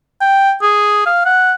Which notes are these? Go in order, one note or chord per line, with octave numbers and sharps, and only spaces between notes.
G5
G#4
F5
F#5